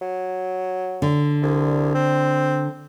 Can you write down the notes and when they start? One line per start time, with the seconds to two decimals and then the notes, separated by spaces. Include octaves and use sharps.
0.01 F#3
1.02 D3
1.42 C2
1.95 C4